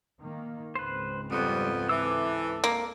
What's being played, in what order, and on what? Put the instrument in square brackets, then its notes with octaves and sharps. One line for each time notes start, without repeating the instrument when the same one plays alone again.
[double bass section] D#3 A#3
[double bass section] C#2 G#2 C4 [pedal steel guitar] B4 C5
[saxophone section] F2 B3 [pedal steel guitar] G3
[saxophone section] E3 [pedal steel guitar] A4 D6 E6
[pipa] A#3